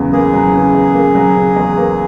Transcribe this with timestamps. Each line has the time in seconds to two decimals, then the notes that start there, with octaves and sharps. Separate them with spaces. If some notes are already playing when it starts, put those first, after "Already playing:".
Already playing: E2 C#3 F#3
0.13 A#3 G#4
0.34 F#3
0.53 C#3
0.74 E2
0.95 A#3
1.15 F#3
1.36 C#3
1.56 E2
1.77 A#3